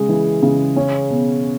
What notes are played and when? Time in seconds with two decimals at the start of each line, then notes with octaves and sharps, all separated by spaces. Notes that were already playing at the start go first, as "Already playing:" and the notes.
Already playing: C#3 G#3
0.09 E3
0.42 C#3
0.76 C#4
1.10 B2